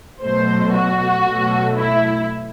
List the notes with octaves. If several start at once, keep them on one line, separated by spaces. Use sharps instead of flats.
B2 F#3 A3 C5
F#4
B2 F#3 A3
E4